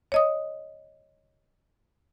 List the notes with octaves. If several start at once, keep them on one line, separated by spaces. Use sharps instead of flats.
C#5 D#5 D#6